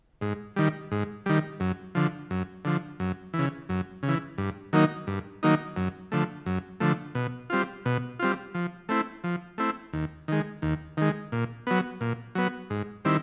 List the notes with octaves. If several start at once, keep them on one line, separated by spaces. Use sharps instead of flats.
G#2
D#3 G3
G#2
D#3 G3
F#2
D3 F3
F#2
D3 F3
F#2
E3
C#3
F#2
C#3
E3
G2
D#3 F#3 A#3 D#4
G2
D#3 F#3 A#3 D#4
F#2
D3 F3 A3
F#2
D3 F3 A3
B2
G3 C4 F4
B2
G3 C4 F4
F3
A3 C4 E4
F3
A3 C4 E4
D#2
D#3 G#3
D#2
D#3 G#3
A#2
F#3 B3
A#2
F#3 B3
G#2
D#3 G3 C4 E4